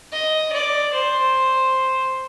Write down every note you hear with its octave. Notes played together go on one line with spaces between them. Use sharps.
D#5
D5
C5